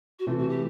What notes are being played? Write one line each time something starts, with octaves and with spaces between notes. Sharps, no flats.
F#4
C3 E3 A3 F4
F#4
G4